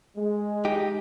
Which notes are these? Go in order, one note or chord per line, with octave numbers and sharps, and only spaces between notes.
G#3
D#4 G4